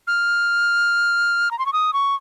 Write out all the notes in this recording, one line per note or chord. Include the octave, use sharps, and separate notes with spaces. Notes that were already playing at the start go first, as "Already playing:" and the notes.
F6
A#5
C6
C#6
D#6
C#6